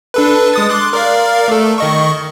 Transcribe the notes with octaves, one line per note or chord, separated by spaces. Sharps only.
D4 A4 B4
G#3 D#6 A6
C6 D6 F#6
A#4 D5 F5
A3 A4
D#3 D#5 C#6